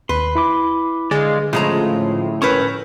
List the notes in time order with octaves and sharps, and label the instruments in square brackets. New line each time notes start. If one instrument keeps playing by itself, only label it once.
[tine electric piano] D#2 [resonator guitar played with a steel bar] B4 [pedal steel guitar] C6
[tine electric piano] E4 B5 D6
[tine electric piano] D3 [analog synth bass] G#3 [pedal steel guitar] D5 F5
[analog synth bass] A2 [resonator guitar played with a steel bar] C#3 G#3 A#5 [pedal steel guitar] F3 F4
[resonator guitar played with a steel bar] C#4 A#4 B4 [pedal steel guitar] C#6 E6 G6